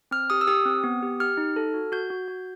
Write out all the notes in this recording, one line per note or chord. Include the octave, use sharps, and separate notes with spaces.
C4 F6
G4 D#6
E6
G4 D#6
C4
B3
G4
G4 F6
D#4
A4
F#4
F#4 G6
F#4
F#4